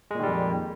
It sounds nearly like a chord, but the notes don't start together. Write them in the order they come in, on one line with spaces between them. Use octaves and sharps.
G#3 A#2 D#3 G3 F2